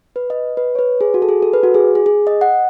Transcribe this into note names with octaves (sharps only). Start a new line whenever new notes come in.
B4
D#5
B4
C#5
B4
G#4
F#4
A4
G#4
A4
B4
F#4
G#4
G#4
G#4
D#5
F#5